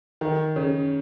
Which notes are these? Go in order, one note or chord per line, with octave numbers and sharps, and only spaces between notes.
D#3
C#3